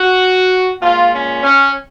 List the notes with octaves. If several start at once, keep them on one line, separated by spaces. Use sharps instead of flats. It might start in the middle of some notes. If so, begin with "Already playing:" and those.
Already playing: F#4
A#2 G#3 F4
C#4
C#4